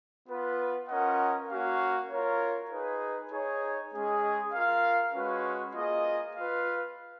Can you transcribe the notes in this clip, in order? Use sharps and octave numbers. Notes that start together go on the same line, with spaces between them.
B3 F4 B4
C#4 F4 A#4 D#5 F#5
A#3 C#4 F#4 A#4 F5
F4 A#4 C#5
D#4 G#4 B4
D#4 G#4 C#5
G#3 C#4 G#4 D#5
F4 A#4 F5
G#3 C#4 F#4 B4
A#3 F4 G#4 D#5
F4 B4 F5